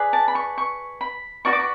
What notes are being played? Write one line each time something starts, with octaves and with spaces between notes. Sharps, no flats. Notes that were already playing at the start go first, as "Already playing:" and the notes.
Already playing: G#4 B4 D5
A5
B5
C#6
C#6
B5
F#4 B4 D5 C#6
D6
C#6